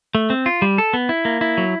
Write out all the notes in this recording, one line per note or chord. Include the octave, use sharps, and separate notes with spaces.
A3
C4
F4
G3
A4
B3
E4
A#3
E4
F#3